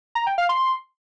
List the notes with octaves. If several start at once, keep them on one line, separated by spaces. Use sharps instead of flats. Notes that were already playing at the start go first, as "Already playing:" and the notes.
A#5
G5
F5
C6